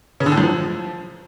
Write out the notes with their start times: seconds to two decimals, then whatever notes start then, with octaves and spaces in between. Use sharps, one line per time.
0.20 C#3
0.26 D3
0.32 A2
0.38 F#2
0.43 F3